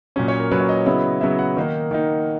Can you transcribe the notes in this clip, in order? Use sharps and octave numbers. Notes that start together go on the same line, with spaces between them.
A#2 F#3 C#4
C#5
A#4
A#2 F#3 C#4 B4
C#5
D#5
C#3 F#3 B3 E4
C#3 F#3 B3 E4 E5
F#5
D#3 A#3 D#4
D#3 A#3 D#4